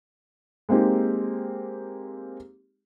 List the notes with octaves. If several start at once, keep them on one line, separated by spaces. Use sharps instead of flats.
G#3 A#3 C4 D#4 G4